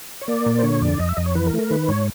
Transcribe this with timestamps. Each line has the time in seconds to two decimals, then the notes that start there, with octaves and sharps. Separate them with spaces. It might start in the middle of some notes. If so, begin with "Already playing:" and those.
0.21 C#5
0.28 A#3 D5
0.46 A#2
0.58 C5
0.63 D3 C#5
0.81 F2 D5
1.00 F2 D#5
1.09 E5
1.17 F2 D#5
1.26 C#5
1.35 E3 B4
1.46 A#4
1.53 A3
1.59 A#4
1.70 D#3 B4
1.88 G#2 C#5